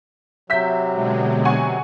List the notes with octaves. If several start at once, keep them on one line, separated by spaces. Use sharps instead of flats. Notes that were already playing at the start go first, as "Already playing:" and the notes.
C3 F#3 E5 G6 B6
B2 D3 G#3
F#5 G#5 C#6